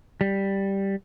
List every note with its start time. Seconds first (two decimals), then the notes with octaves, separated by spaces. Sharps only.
0.21 G3